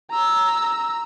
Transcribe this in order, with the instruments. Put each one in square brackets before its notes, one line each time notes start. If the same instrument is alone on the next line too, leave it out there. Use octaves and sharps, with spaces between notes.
[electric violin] A#5 E6